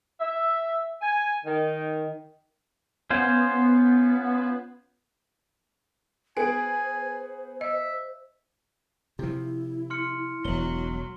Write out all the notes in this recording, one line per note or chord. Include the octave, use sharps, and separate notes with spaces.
E5
G#5
D#3
B3 C#4 F4 C5
B3 G#4 C5 G#5 D7
D#5 E5
C3 F3 E4
C6 F6 C#7
E1 F#3 F#7 G7